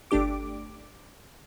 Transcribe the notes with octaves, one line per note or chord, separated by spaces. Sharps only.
G1 A3 D4 G4 D6